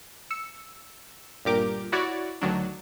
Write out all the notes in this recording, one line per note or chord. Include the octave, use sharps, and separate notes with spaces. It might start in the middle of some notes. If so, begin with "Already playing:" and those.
E6 C#7
G1 A#2 G4 A#4 D6
E4 F#4 C#5 D5
D2 D#3 F#3 D4